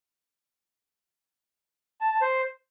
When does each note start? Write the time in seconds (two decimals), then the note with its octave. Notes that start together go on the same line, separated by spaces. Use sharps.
2.01 A5
2.11 A5
2.21 C5